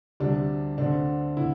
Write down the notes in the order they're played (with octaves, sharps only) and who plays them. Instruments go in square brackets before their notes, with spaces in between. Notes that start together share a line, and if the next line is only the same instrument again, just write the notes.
[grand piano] D2 C3 G3 D4
D2 D3 A3 C4 D4
D3 E4